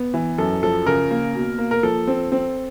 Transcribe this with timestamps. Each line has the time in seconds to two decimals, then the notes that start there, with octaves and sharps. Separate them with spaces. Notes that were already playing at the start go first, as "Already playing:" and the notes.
Already playing: B3
0.14 E3
0.38 F#2 A4
0.63 F3 A4
0.86 C#3 A#4
1.11 A#3
1.35 B2
1.59 A#3
1.71 A#4
1.83 F3 A4
2.07 C4
2.32 C4